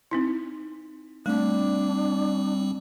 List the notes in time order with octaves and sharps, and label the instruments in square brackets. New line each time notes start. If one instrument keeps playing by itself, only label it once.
[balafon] C4 D#4 E4
[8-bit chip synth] G3 C4 [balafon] A3 [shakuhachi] D4